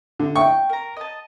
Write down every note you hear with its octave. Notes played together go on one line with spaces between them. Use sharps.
D3
G5 C#6
A#4 A#5
D#5 A5